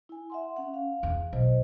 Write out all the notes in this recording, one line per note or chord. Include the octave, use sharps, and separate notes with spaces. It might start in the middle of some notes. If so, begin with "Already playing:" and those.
E4 G#5
E5 F#5 C6
C#4 F#5
F5
E2
B1 C5 D#5